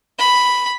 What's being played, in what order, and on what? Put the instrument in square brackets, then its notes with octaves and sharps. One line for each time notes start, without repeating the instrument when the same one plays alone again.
[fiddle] B5